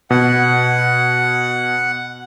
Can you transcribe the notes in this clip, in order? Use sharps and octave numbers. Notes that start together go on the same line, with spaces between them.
B2 F#5